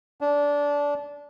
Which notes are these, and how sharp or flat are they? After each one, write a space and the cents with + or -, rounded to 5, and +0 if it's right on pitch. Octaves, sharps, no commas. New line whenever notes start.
D4 -20